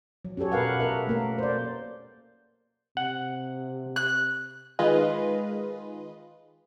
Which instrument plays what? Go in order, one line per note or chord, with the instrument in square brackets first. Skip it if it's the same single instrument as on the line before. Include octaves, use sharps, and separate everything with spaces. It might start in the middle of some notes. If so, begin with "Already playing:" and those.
[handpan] F#3
C#4 F#4 G4 A4 C#5
B2 A#4 B4 F5 F#5
A4 A#4 E5
A3 A#3 A#4
C5 D5
[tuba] C3 [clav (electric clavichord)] F#5
[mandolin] F#6
[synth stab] D#3 G#3 F4 G#4 B4 D#5